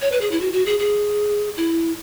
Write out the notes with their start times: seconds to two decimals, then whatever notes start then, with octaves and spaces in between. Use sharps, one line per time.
0.01 C#5
0.12 B4
0.21 G#4
0.31 E4
0.41 F#4
0.53 F#4
0.66 G#4
0.79 G#4
1.57 E4